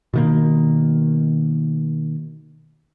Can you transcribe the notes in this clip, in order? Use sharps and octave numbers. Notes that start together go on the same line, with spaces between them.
B2 D#3 A#3